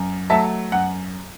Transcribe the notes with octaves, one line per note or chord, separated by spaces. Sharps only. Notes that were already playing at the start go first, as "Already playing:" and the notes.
Already playing: F#2
F#3 A3 E5 A5
F#2 F#5